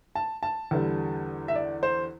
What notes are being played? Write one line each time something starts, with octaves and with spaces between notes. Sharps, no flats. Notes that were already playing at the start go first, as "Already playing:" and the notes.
A5
A5
E2 D3 G3
E5
D5
C5